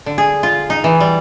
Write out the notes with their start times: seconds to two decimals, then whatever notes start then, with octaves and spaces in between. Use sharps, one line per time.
0.06 D3
0.18 G#4
0.43 F4
0.70 D#4
0.84 E3
1.00 G3